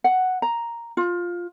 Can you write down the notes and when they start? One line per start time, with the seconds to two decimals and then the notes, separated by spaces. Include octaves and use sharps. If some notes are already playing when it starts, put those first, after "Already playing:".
0.04 F#5
0.42 A#5
0.97 F4